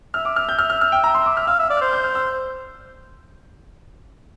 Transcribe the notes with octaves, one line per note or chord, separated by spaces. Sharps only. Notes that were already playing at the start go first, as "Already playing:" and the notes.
E5 F6
D6
F6
G6
E5 F6
F6
F6
G5
A#5
C6
D6
F6
F5 E6
E5 E6
D5
F6
C5
G6
F6
E6